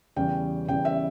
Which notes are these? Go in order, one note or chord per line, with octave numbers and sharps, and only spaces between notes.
E2 C#3 G3 C#4 G5
E2 C#3 G3 C#4 G5
E5